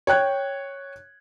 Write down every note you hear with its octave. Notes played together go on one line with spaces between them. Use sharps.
C#5 G5 F#6 G#6